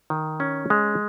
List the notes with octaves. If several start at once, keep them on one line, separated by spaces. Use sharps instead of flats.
D#3
C#4
G#3